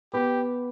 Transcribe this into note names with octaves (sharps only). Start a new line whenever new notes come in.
B3 G4